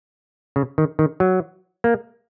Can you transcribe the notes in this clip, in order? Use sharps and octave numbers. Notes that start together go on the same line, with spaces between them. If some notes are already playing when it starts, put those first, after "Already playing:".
C#3
D#3
D#3
F#3
A#3